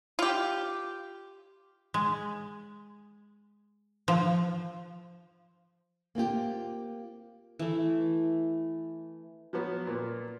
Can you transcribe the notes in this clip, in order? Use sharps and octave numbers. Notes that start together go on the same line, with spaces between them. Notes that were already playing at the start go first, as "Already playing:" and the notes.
F4 G4
G#3
F3
A#3 C4 F4 G4
E3 A3
F3 F#3 B3
A#2